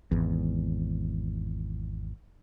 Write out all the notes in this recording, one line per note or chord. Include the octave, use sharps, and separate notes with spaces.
G#1 E2